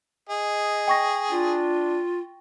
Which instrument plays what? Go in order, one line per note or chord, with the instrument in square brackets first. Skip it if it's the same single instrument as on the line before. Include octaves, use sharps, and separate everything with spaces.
[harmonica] G#4 [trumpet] D#5
[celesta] G5 C#6 A#6
[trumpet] D4 [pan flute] F4